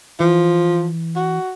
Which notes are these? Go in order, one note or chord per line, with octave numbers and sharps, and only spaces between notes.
E3 F3
F#4